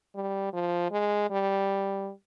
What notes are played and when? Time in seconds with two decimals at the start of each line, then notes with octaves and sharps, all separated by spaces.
0.15 G3
0.53 F3
0.92 G#3
1.30 G3